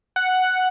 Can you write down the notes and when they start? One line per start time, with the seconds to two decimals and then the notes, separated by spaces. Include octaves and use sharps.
0.16 F#5